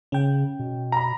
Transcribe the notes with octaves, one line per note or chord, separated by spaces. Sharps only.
C#3 C#4 G5
B2
A#5 B5